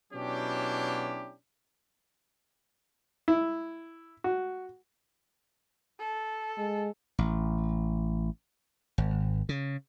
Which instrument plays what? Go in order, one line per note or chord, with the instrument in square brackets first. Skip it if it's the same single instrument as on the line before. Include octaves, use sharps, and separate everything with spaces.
[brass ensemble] B2 F#3 C#4 D4 E4 G4
[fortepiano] E4
F#4
[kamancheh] A4
[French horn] G#3
[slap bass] A1
G#1
C#3